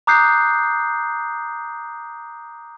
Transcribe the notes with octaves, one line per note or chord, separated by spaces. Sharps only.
A#5 D6 D#6 F#6 G6 C7